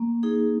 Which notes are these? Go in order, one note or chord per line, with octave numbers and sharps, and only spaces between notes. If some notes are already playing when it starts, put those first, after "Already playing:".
Already playing: A#3
D#4 G#4